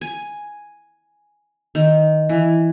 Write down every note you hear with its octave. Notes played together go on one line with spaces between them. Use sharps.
G#5
D#3
E3